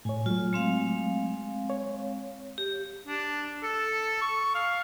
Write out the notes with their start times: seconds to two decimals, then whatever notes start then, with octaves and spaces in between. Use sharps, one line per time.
0.05 A2 C#5 G#5
0.26 F#3 A3 F4
0.53 G#3 C4 F5
1.70 C#5
2.58 G4
3.07 D4
3.63 A4
4.22 C#6
4.55 F5